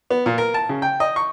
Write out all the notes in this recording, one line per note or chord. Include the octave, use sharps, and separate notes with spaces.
B3
A#2
A#4
A5
C#3
G5
D#5
C#6